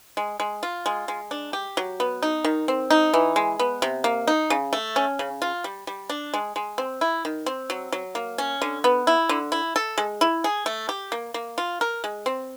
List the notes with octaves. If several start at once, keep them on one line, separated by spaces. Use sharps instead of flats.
G#3
G#3
F4
G#3
G#3
D4
G4
F#3
B3
D#4
D#3
C4
D#4
E3
G#3
B3
C3
A#3
D#4
C#3
A3
C#4
C#3
F4
G3
G3
D4
G#3
G#3
C4
E4
D#3
C4
F#3
F#3
A#3
C#4
D3
B3
E4
D3
E4
A4
G#3
E4
G#4
A3
G4
A#3
A#3
F4
A#4
G#3
C4